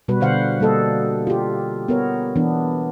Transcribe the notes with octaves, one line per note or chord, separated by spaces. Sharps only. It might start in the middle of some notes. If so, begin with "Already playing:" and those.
B2 G3 F#4 B4
B2 D3 C5 F5 F#5
G3 A#3 A4 D#5
F4 G4
B3 A#4 C#5
E3 B3 D4